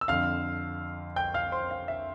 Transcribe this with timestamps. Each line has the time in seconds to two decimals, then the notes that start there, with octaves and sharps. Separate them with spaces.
0.01 E6
0.08 F2 D3 F5 F6
1.16 G5 G6
1.34 F5 F6
1.52 C5 C6
1.71 F5
1.88 E5